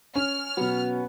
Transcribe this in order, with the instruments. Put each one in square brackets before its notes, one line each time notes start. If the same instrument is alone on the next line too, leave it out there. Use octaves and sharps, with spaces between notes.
[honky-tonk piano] C#4 [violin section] F6
[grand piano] B2 F#3 [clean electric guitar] B3